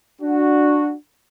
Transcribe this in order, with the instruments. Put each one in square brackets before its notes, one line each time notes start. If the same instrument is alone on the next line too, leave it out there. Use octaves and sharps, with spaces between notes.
[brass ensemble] D4 F#4